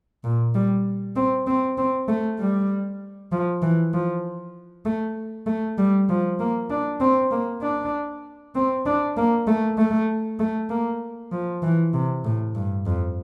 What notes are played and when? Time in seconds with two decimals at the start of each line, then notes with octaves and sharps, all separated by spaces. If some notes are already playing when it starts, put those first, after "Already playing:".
0.24 A#2
0.55 G3
1.16 C4
1.47 C4
1.78 C4
2.08 A3
2.39 G3
3.32 F3
3.62 E3
3.94 F3
4.85 A3
5.47 A3
5.78 G3
6.09 F3
6.40 A#3
6.70 D4
7.00 C4
7.31 A#3
7.62 D4
8.55 C4
8.86 D4
9.17 A#3
9.47 A3
9.78 A3
10.40 A3
10.70 A#3
11.32 F3
11.63 E3
11.94 C3
12.25 A2
12.55 G2
12.86 F2